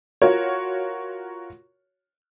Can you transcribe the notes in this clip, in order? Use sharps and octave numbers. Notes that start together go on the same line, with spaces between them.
F4 F#4 A#4 C#5